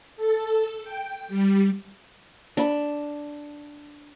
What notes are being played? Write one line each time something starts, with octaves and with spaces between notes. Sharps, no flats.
A4
G5
G3
D4 B5